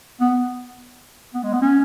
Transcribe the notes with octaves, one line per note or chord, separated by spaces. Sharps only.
B3
B3
G#3
B3
C#4